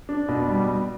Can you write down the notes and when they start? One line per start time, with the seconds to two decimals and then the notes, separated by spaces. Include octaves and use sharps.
0.09 D4
0.28 B2
0.48 G3
0.67 G3